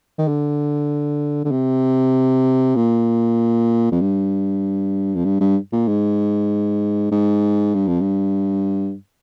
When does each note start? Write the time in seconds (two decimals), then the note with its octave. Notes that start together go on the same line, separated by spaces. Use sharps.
0.18 D#3
0.28 D3
1.44 D3
1.51 C3
2.76 A#2
3.92 F2
4.01 G2
5.15 F2
5.24 G2
5.40 G2
5.72 A#2
5.88 G#2
7.11 G#2
7.74 G2
7.87 F2
8.01 G2